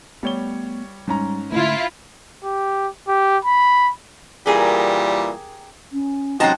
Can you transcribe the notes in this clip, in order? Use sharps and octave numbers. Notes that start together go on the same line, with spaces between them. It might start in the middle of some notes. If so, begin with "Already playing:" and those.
G3 A3 B3 C#5 G7
G#2 G3 C#4 A#5
D3 A3 E4 F4
G4
G4
B5
A#2 E3 G3 G4 G#4 A#4
C#4
G#2 C3 F#3 C#4 D#5 G5 A5 A#5